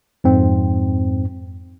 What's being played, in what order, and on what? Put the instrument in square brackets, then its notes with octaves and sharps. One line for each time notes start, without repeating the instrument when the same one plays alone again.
[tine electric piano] F2 G#2 C4